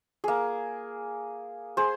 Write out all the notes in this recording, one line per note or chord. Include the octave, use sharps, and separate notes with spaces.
A#3 G#4
G#4 C5